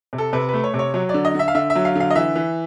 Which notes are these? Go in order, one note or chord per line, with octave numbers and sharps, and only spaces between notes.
C3
A4
C3 B4
A3 B4
C#5
C3
C#5
F#3 C#5
D5
D3
D#5
D3 E5
F5
D3 E5
E5
F#3
F5
D3 F5
D#5
E3 E5
E3